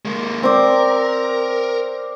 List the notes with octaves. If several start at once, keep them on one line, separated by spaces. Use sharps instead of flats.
G#3 A#3
C4 A#4 D5